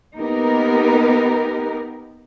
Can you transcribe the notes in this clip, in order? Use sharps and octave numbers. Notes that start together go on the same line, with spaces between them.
A#3 B3 D#4 G4 A#4 B4